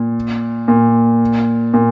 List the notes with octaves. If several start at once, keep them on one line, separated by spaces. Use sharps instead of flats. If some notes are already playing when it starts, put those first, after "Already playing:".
Already playing: A#2
A#2
A#2